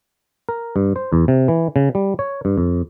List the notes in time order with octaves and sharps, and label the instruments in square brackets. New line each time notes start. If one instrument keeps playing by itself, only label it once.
[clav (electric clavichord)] A#4
G2
C5
E2
C3
E3
C#3
G3
C#5
G2
F2